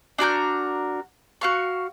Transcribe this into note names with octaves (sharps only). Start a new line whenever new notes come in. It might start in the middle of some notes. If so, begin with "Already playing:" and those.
D4 F#4 A#4 G6
F#4 F5 C#6